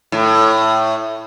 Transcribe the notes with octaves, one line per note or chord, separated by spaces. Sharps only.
A2